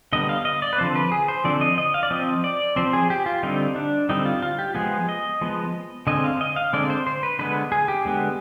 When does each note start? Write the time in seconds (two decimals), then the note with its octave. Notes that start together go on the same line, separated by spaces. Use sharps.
0.13 D3 G3 B3 D#5
0.29 F5
0.45 D#5
0.62 D5
0.73 B4
0.78 D3 F3 C4 C5
0.95 B4
1.12 G#4
1.28 C5
1.44 D3 F3 C4 D5
1.61 D#5
1.78 D#5
1.94 F5
2.03 D5
2.11 F3 C4 D#5
2.44 D5
2.76 F3 C4 C5
2.93 G#4
3.10 G4
3.26 F4
3.43 D3 G3 C4 D#4
3.76 D4
4.09 D3 G3 C4 D#4
4.25 F4
4.42 F4
4.59 G4
4.75 F3 G#3 B3 G#4
5.09 D#5
5.41 F3 G#3 B3
6.07 D3 G#3 C4 D#5
6.24 F5
6.41 D#5
6.56 F5
6.73 D3 G#3 C4 D5
6.90 C5
7.07 C5
7.23 B4
7.39 D3 G#3 B3 B4
7.72 G#4
7.88 G4
8.05 D3 G#3 B3